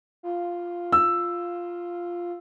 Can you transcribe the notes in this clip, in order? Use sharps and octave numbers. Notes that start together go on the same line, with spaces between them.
F4
E6